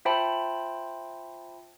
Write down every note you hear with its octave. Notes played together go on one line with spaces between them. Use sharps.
F4 C5 E5 G5 A5 B5